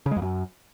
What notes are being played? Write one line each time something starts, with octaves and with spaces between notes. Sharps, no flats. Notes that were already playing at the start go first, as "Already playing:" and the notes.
C#3
G#3
F2
F#2